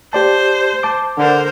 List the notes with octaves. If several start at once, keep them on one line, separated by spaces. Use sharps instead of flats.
G4 C5 D5 A5
A5 D6
D3 A#4 C5